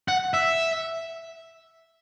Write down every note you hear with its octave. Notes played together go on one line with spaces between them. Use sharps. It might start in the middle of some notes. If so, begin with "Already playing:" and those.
F#5
E5